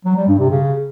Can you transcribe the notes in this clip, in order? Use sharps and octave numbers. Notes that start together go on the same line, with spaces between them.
F#3
G3
G2
C3
C#3